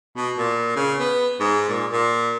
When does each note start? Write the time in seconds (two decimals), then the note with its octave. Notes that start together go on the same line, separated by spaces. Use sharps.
0.16 B2
0.38 A#2
0.76 C#3
0.99 B3
1.40 G#2
1.68 A#2
1.92 A#2